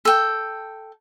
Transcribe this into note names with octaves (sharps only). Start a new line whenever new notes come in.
A4 G5